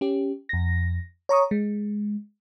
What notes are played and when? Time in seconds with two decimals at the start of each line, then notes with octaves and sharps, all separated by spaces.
0.01 C#4 G4
0.49 F2 A#6
1.29 C#5 A#5 C#6 D#6
1.51 G#3